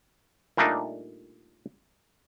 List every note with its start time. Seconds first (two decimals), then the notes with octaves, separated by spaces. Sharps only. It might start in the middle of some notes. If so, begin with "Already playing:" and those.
0.57 A#2 G3 A3 A#3 D4 D#4